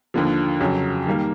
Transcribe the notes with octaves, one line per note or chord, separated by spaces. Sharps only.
D#2 D3 F3
F2 C#3 F#3
D#3 G3 A#3